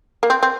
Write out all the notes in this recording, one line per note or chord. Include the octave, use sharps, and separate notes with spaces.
A#3
C4
C4